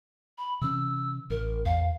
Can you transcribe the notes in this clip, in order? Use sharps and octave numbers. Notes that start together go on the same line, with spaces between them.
B5
C3 E3 C#4 E6
A1 A#4
E2 F5